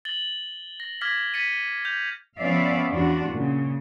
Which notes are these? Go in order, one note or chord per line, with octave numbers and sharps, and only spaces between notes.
A6 F#7 G7
A#6
D6 F6 G#6 A#6 B6
A6 B6 C#7 D#7
G6 F7
F3 B3 C#4 D5 E5 F5
E2 D4 F4 F#4
A#2 C#3